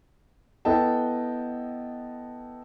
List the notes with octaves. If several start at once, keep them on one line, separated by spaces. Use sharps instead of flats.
B3 E4 A4 D#5 G5 A5